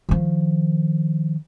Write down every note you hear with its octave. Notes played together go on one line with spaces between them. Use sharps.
D#3 F3